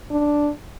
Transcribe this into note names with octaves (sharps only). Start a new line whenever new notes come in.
D4